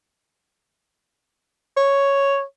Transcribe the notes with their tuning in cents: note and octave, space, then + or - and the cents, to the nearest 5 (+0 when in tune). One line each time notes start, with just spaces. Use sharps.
C#5 +0